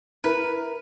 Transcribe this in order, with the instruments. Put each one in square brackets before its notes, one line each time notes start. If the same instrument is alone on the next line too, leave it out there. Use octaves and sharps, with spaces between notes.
[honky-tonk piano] E4 A#4 [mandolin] B4